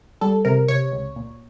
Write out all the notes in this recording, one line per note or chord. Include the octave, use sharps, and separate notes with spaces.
G3 A4
C3 A#4
C3 C#5
C#2
A#2